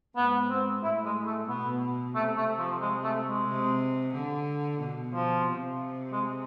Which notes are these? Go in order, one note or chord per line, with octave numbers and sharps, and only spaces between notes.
G#2 B3
C4
A2 E4
G#3
A3
B2 B3
C3 A3
A3
F3
G#3
A3
G#3
C3
D3
B2
F3
C3
G#3